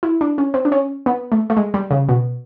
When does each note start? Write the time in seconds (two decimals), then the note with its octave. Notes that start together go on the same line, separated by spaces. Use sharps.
0.03 E4
0.21 D4
0.38 C#4
0.54 C4
0.65 D4
0.72 C#4
1.06 B3
1.32 A3
1.50 A3
1.57 G#3
1.74 G3
1.91 C#3
2.09 B2